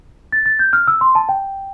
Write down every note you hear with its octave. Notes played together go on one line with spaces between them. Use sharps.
A6
A6
G6
F6
E6
C6
A5
G5